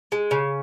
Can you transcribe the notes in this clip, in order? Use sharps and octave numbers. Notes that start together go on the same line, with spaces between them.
G#3
C#3